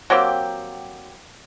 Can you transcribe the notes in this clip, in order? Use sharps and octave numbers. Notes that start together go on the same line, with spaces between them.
F#3 A#3 C4 G4